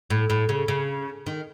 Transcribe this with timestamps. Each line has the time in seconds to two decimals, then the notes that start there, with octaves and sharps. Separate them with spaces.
0.10 A2
0.30 A2
0.49 C#3
0.68 C#3
1.26 D#3